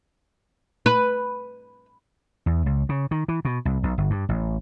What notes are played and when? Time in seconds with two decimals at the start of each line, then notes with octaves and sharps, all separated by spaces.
0.86 B4
2.46 E2
2.66 C#2
2.89 C#3
3.11 D#3
3.28 E3
3.45 B2
3.65 C2
3.83 B1
3.98 G1
4.10 G2
4.29 A1